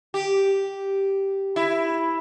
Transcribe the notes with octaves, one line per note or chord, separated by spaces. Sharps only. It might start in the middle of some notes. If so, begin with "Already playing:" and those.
G4
E4